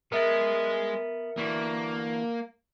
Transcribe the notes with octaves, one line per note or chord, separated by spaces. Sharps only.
G#3 B3 A#4 E5 A6
D3 E3 A#3 F#4